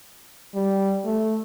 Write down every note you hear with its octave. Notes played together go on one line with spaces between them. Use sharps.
G3
A3